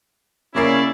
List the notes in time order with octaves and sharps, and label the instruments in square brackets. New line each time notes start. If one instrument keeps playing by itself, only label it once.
[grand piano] C#3 A#3 C7 [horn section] C#4 E4 D5